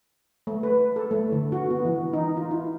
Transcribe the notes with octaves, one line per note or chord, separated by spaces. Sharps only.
A3
B4
A4
A3
D3
F#4
B3
E3
D#4
F4
E4